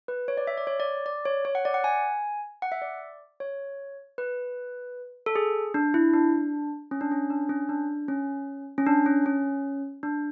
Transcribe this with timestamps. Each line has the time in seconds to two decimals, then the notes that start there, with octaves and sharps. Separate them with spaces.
0.08 B4
0.28 C#5
0.37 D5
0.47 E5
0.58 D5
0.67 C#5
0.80 D5
1.06 D5
1.25 C#5
1.45 C#5
1.55 F#5
1.65 D5
1.74 F#5
1.84 G#5
2.62 F#5
2.72 E5
2.82 D5
3.40 C#5
4.18 B4
5.26 A4
5.36 G#4
5.74 D4
5.94 E4
6.13 D4
6.91 C#4
7.01 D4
7.11 C#4
7.30 D4
7.49 C#4
7.69 D4
8.08 C#4
8.78 C#4
8.86 D4
9.06 C#4
9.26 C#4
10.03 D4